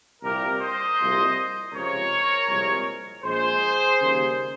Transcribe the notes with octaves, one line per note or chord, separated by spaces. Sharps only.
C2 A#2 G3 A#3 G4 A#4
C5 D#5
C2 A#2 F3 G#3
C#2 C3 F3 G#3 A#4 C#5
C2 A#2 F3 G#3
A#1 A#2 G#3 G#4 C5
D#2 C#3 G3 A#3